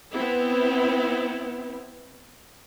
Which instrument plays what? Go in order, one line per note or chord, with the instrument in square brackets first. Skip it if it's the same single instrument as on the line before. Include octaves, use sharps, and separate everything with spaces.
[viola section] B3 C4 E4